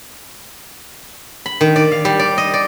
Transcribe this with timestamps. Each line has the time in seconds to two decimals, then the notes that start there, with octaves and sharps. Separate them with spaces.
1.46 B5
1.61 D#3
1.76 D5
1.92 F5
2.05 G3
2.19 D5
2.38 D#5
2.54 D5